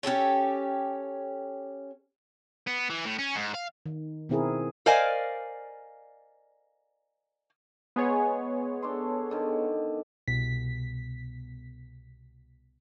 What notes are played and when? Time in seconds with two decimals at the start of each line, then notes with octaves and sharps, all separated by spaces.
0.03 C#4 G4 A4 C#5
2.67 B3
2.90 E3
3.05 A2
3.18 C#4
3.35 G#2
3.55 F5
3.86 D#3
4.29 B2 D#3 C4 E4 G#4 A#4
4.86 A#4 C5 D5 D#5 F5 G#5
7.96 G#3 B3 G#4 C#5
8.82 D4 A4 C6
9.30 B2 D3 D#3
10.28 C2 B2 B6